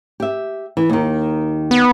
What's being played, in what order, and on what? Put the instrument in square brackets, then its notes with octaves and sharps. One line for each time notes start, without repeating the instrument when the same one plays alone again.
[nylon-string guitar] G4 E5
E3
D#2 D#3
[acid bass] B3